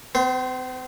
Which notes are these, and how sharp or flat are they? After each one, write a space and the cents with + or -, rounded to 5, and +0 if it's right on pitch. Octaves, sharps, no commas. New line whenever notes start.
C4 -45 C5 +0